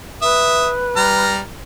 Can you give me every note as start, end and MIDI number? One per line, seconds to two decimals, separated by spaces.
0.22 1.41 71
0.22 0.69 76
0.22 0.69 87
0.96 1.41 55
0.96 1.41 82
0.96 1.41 89